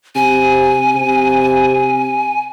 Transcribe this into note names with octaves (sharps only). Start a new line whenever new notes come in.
C3 G#5
C3